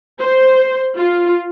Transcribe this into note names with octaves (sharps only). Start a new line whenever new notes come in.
C5
F4